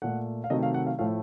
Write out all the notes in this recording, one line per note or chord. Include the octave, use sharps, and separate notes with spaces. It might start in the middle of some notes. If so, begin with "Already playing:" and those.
A#2 A3 F#5
F5
C3 D#3 F#3 A3 D#5
F5
F#5
F5
A2 F3 A3 F5